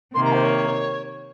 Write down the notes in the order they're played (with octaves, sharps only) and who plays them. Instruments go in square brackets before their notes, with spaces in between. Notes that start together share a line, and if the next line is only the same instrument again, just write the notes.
[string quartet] C3 D#3 A#3 [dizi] C6
[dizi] A#5
C5
C#5